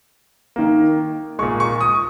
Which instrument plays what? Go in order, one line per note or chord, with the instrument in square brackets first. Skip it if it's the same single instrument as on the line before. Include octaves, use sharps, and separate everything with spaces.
[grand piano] D#3 A#3
A#2 G#3 C#6
C#6
D#6